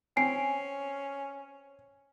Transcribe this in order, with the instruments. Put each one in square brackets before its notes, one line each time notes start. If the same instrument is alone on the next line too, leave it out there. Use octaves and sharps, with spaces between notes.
[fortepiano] C4 [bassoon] C#4 [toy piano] G#5 [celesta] C7